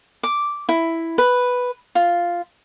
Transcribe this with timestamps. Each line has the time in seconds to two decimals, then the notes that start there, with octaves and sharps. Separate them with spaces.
0.23 D6
0.69 E4
1.18 B4
1.95 F4